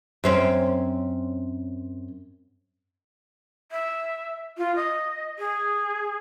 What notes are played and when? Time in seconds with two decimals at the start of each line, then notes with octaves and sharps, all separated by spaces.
0.24 F#2 C4 C#4
3.72 E5
4.58 F4
4.75 D#5
5.38 G#4